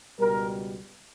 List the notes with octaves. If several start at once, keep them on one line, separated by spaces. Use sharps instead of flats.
C#2 B2 G3 A#4